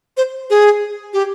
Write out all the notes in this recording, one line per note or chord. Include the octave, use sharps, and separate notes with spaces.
C5
G#4
G4